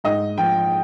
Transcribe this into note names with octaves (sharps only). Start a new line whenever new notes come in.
G#2 D#5
F3 G5